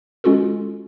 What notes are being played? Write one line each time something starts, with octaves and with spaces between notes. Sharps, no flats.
G#3 C#4 F4 F#4 A4